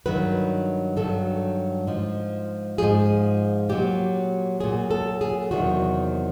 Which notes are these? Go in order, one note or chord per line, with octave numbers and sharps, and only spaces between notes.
G2 D#3 F#3 B4
G2 D#3 F#3 A4
G#2 F3
G#2 F3 G#4
A#2 F#3 G4
A#2 F#3 G#4
A4
G#4
E2 C3 D#3 F#3 F#4